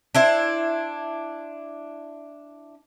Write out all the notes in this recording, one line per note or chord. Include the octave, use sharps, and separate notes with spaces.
D4 E4 C5